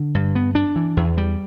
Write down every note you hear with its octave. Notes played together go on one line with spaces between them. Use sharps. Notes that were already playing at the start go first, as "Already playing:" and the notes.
Already playing: D3
G2
B3
D4
E3
E2
G3